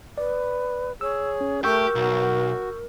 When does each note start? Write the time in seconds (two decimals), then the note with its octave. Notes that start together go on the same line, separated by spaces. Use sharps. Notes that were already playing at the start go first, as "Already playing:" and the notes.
0.18 B4 D5
1.01 G#4 C#5 E6
1.41 C#4
1.64 A3 G4 A#4 C#6 E6 G6
1.95 B1 F#4